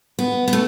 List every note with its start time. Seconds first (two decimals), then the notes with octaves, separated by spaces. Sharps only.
0.19 B3
0.48 B3
0.53 A3